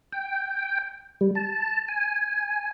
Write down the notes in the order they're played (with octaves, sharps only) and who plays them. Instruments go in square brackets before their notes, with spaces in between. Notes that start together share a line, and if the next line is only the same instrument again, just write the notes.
[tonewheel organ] G5
G3
A5
G#5